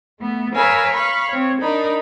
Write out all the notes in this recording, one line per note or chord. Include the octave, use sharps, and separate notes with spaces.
A3 B3
A#4 B4 C#5 F5 G#5 E6
F5 B5 C#6
C4 C#5
D4 D#4 A#4 B5